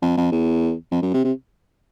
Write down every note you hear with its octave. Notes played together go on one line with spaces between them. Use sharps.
F2
F2
E2
F2
F#2
C3
C3